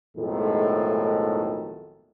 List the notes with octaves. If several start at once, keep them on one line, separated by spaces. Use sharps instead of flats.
B1 F2 A2 D#3 G#3 A3